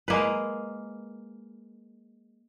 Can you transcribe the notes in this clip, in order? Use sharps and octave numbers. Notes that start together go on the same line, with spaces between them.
G#3 A#3 B4